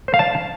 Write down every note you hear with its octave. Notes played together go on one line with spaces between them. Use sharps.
C5
F5
A5